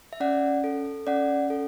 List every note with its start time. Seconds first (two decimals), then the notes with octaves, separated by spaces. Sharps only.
0.13 E5
0.20 C#4 D5 F#5
0.64 A4
1.07 C#4 D5 F#5
1.50 A4